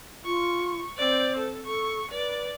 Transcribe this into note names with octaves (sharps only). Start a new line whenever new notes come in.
F4 C#6
C4 C5 D5
A4
A4 C#6
B4 D5